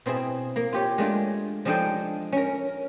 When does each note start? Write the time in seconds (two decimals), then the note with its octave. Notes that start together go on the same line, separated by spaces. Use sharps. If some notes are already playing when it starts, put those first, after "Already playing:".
0.06 B2 C4 E4 G#4
0.56 A#3
0.73 F4 G4 C#5
0.98 G#3 A3 D4 F4
1.65 F3 G#3 D4 D#4 A4 G5
2.32 C#4 A#4